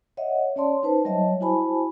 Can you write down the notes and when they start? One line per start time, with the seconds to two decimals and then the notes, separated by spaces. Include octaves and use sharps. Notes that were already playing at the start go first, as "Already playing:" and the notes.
0.17 C#5 D#5 E5 F#5
0.56 C#4 C#5 D5 A5 C6
0.83 D#4 B4 C5 A5
1.05 F#3 G3 C#5 D#5 E5 A5
1.41 E4 F#4 C5 G#5 A5 B5